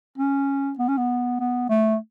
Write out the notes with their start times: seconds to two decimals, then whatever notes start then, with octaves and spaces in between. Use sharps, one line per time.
0.18 C#4
0.78 B3
0.88 C#4
0.97 B3
1.40 B3
1.69 A3